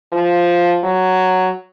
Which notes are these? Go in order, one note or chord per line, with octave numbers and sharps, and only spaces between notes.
F3
F#3